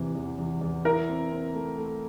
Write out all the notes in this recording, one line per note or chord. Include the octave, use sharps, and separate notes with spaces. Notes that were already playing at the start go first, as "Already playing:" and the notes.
Already playing: E2 C3 E3
E2
E2
E2
E4 A#4
C4
C4
A3
A3